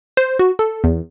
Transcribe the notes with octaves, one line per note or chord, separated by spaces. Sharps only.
C5
F#4
A4
E2